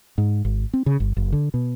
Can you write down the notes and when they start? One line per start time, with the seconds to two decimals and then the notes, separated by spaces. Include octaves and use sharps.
0.18 G#2
0.45 G#1
0.74 C4
0.86 C#3
1.00 G1
1.17 F#1
1.33 D3
1.54 B2